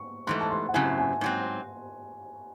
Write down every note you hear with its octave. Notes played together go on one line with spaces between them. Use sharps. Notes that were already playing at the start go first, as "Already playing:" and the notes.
Already playing: C#6
G#2 E3 A3 C6
A5
C6
F#5
F#2 C#3 F#3 C4 E4 G#5
G#5
G#2 F#3 C4